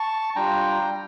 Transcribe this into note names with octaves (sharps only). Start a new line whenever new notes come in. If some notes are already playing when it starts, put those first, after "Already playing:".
Already playing: A5 C#6
G3 D4 F4 G5 A#5